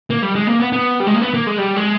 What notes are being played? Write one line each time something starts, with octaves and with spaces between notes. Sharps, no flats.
A#3
G3
G#3
A#3
B3
B3
G3
G#3
A#3
B3
A#3
G#3
G3
G#3